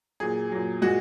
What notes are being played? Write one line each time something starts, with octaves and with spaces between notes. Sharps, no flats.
A#2 F#3 G#4
A#2 F#3
A#2 G#3 F#4